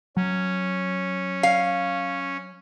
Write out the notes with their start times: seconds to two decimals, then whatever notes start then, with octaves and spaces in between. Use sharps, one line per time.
0.17 F#3 C#4
1.43 F5